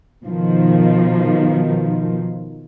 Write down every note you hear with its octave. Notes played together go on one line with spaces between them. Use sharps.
B2 D#3 F3